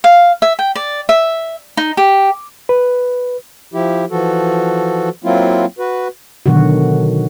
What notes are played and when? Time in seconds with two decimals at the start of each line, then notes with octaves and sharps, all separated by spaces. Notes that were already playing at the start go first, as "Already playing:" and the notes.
0.04 F5
0.42 E5
0.59 G5
0.75 D5
1.09 E5
1.77 D#4
1.97 G4
2.69 B4
3.74 F3 E4 G4
4.10 E3 F3 F#4 A4
5.24 F#3 A#3 C4 E4 F4
5.79 F#4 B4
6.46 B2 D3 D#3 F#3 F#4